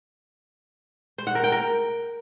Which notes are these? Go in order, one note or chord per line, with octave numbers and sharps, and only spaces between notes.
C5
F#5
A#4
G5
A#4